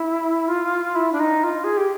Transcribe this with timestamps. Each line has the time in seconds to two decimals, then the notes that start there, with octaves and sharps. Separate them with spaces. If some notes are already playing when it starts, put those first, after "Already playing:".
Already playing: E4
0.48 F4
0.95 E4
1.12 D4
1.20 D#4
1.44 F4
1.64 G#4
1.77 G4